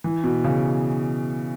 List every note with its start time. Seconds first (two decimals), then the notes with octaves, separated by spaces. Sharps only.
0.04 E3
0.24 B2
0.44 C#3